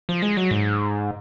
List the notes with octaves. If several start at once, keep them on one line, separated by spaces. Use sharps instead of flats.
F3
G#3
F#3
G#2